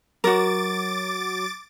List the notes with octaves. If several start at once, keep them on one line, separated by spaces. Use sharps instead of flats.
F#3 F#4 A#4 D6 A6